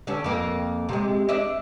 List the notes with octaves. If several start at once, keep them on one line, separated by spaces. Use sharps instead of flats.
D3 C#4 A4
F2 A#3
C3 G#3
D4 D#5 E5